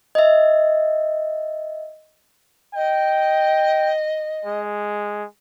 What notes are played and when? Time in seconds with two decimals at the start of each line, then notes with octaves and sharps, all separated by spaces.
0.15 D#5 E5
2.74 D#5 G5
4.45 G#3